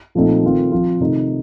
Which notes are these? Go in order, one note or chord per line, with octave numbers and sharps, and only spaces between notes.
A#2 F3 A3 C4 D#4
D#3 A3 C4 F4
F3 C4 F4
C3 D#3 A3 D#4